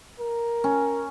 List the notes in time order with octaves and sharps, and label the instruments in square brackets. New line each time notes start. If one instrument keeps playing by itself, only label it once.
[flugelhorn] A#4
[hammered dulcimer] C#4